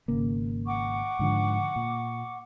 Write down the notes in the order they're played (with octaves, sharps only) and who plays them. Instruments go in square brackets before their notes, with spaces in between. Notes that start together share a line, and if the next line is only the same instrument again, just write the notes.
[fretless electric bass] G#1 C#3 A#3
[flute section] F#5 C#6 D6
[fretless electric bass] G#2 D3 F3
A#2